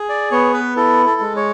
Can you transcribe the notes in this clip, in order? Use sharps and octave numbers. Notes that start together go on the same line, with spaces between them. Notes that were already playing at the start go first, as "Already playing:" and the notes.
Already playing: G#4
D5
B3 C#5
B4
E4 A4
A4
G#3
C#5